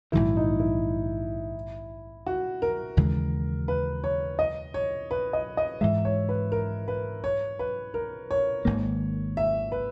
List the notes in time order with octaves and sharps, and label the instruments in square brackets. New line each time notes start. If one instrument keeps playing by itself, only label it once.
[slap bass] A#1 G#2 D#3 F#3 [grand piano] E4
[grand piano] D#4
E4
F#4
A#4
[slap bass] D#2 C#3 E3 G#3
[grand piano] B4
C#5
D#5
C#5
B4
D#5
D#5
[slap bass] G#2 E3 G#3 [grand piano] E5
[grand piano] C#5
B4
A#4
B4
C#5
B4
A#4
C#5
[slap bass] G#1 G#2 D#3 A#3
[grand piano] E5
B4